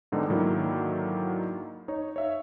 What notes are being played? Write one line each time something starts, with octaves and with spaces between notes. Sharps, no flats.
G#2 D3 D#3 G#3 B3 D#4
G#2 D3 D#3 F#3 A#3 E4
D#4 C#5
C#5 E5 F5